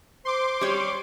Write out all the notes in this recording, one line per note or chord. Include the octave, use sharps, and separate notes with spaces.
C5 C6 D6
G3 C#5